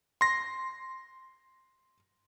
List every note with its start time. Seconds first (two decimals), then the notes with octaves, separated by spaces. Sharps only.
0.21 C6 A#6